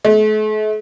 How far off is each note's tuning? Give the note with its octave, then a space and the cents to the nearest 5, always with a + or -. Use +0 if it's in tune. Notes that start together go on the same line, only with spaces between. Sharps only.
A3 -45